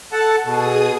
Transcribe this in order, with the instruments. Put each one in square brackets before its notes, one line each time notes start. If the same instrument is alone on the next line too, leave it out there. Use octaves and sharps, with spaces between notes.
[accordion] A4 F#5 A5
[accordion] B2 [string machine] G#4 D#6